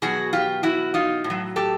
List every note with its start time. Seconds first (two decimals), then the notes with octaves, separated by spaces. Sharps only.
0.02 B2 F#3 F#4 G#4
0.33 F4 G4
0.63 E4 F#4
0.94 D#4 F4
1.24 A2
1.30 F#3
1.56 G4 A4